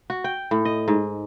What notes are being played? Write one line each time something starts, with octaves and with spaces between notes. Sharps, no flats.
F#4
G5
A2
D#5
G#2